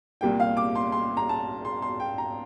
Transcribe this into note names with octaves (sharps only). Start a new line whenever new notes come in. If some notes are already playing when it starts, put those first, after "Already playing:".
C2 A#2 G3 A#3 G5
F5
D6
C6
C6
A#5
A5
C6
C6
G5
A#5